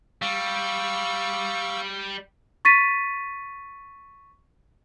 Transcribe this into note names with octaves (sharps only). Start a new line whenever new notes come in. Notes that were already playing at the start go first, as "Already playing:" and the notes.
G3 F5 C#6 E6
C#6 A6 B6 D#7